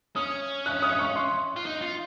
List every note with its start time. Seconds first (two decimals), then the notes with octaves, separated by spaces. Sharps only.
0.16 C#4 D#6
0.66 F#6
0.82 D#6
0.99 C#6
1.16 C6
1.56 F4
1.66 D#4
1.82 F4